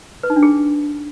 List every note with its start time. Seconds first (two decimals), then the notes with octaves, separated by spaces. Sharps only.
0.23 B4
0.30 D#4
0.36 D4
0.43 G#4